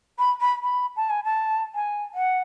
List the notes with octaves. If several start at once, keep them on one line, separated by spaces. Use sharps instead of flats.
B5
B5
B5
A5
G#5
A5
G#5
F#5